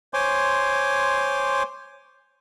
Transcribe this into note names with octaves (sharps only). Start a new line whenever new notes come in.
C5 C#5 G#5 C6 D6